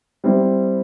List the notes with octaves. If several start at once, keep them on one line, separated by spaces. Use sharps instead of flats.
G3 C4 E4